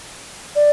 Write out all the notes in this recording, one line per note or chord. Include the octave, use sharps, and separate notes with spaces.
D5